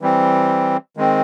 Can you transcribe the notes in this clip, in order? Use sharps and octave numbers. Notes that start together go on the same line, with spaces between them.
E3 G3 C4
D#3 G#3 C4